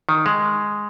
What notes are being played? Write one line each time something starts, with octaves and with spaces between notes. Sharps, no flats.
D#3
G#3